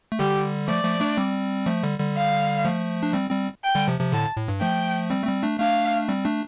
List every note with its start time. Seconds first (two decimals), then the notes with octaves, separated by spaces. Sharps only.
0.12 A3
0.19 D3 G3 G4
0.68 F3 A3 D5
0.84 F3 A3
1.00 A3 D4
1.17 G3 C4
1.66 F3 A3
1.83 D3 G3
1.99 D3 G3
2.16 F5
2.65 F3 A3
3.03 D4
3.13 G3 C4
3.30 G3 C4
3.64 G5
3.75 D3 G3
3.88 C3 F3
4.00 C3 F3
4.12 A2 D3 A5
4.37 A2
4.48 G2
4.61 F3 A3 G5
5.10 G3 C4
5.22 A3
5.27 G3 C4
5.43 A3 D4
5.59 A3 D4 F5
6.08 G3 C4
6.24 A3 D4